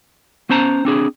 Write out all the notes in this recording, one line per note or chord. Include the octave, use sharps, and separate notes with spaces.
B3 C#4 C5 A5 A#5
C4 D4 G#4